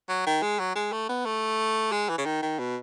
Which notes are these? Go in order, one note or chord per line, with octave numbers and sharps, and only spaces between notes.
F#3
D#3
G#3
F#3
G#3
A3
B3
A3
G#3
E3
C#3
D#3
D#3
B2